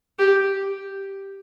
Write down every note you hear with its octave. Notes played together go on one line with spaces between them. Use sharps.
G4